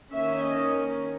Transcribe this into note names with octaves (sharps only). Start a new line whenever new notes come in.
D#3 A#3 C#4 E5
D#5
A#4